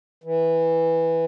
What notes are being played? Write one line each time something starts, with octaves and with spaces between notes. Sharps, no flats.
E3